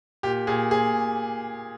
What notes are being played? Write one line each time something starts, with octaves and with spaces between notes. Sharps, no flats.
A#2 G4
A#2 G#4
A#2 G#4